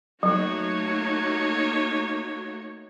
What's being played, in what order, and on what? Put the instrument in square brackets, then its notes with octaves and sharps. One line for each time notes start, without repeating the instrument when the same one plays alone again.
[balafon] F#3 [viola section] A3 A#3 F#4 [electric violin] D#4 C#5